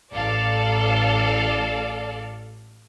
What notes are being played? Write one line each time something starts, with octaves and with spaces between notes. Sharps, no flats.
A1 A4 D5 F5